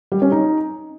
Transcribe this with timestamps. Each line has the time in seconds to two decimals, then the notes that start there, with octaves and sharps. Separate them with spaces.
0.12 G3
0.22 C#4
0.32 D#4